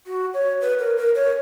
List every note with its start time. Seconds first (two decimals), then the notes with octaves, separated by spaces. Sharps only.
0.07 F#4
0.34 C#5
0.61 B4
0.79 A#4
0.97 A#4
1.15 C#5